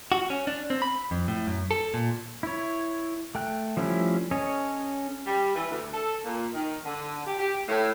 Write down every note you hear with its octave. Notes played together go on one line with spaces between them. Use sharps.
F#4
C#4
D4
C4
B5
F2
A2
F#2
A4
A#2
E4 C#5
A3 G5 F#6
F3 G3 A3 C#4 E4
C#4 A4 C#5 D#5 G#5
G3
E3
D2
A4
A#2
D#3
D3
G4
G4
A2